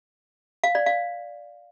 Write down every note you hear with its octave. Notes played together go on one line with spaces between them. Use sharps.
F5
D5
F5